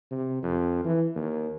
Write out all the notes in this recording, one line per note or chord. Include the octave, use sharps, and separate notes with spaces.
C3
F2
E3
D#2